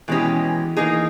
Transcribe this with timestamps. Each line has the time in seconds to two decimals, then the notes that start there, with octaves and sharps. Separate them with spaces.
0.08 B2 E3 G#3 C#4 G4
0.76 E3 A#3 D#4 G#4